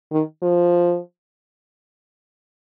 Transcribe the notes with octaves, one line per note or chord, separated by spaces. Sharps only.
D#3
F3